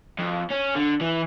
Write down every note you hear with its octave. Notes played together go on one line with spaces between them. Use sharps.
F2
C#4
D3
E3